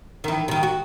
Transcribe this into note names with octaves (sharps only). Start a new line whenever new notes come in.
D#3 E3
C3 D#3
F#4